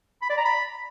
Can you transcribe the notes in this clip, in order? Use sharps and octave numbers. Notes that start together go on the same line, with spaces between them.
B5
D5
A#5
B5